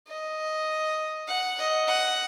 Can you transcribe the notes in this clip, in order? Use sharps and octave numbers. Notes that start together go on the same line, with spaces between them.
D#5
F#5
D#5
F#5